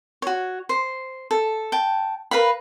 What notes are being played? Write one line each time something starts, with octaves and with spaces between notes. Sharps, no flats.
F#4 C#5
C5
A4
G5 A5
A#4 B4 F5 B5